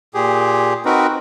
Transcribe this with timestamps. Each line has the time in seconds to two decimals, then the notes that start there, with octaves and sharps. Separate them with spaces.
0.14 A#2 G4 G#4
0.85 C4 D#4 F#4 A#4 B4